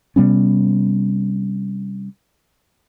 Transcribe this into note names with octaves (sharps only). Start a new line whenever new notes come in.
C3 G3 B3 C#4